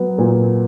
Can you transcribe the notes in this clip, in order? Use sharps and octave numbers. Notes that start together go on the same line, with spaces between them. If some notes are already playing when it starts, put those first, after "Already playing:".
Already playing: F#3 B3
A#2